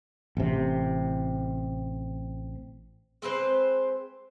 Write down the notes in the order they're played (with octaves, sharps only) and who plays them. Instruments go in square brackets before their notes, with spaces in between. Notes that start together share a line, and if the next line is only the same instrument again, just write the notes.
[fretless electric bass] A1 C3
[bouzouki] G#3 C4 B4 C5